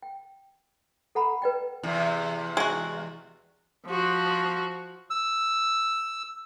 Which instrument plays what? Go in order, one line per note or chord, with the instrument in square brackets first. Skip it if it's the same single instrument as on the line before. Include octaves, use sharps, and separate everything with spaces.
[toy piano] G5
A4 F#5 A#5 B5
B4 D5 G5
[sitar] E2 C3
[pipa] G#3 F#4
[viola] F3 F#4
[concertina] E6